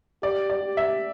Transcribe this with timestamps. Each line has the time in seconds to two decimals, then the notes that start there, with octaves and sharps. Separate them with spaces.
0.22 G4 D5
0.50 D5
0.64 G4
0.77 E5